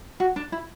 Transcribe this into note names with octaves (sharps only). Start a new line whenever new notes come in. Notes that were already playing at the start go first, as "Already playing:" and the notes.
F#4
D4
E4